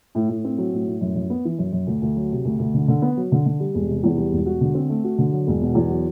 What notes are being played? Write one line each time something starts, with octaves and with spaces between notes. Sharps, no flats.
A2
A2
C4
F#3
A2
A2
F#2
F#2
B3
E3
F#2
F#2
D2
D2
F#3
C3
D2
D2
D3
D3
B3
F#3
D3
D3
G3
E1
C3
E2
G3
E1
F#4
D3
C4
A3
F#4
D3
F#3
E1
B2
E2
F#3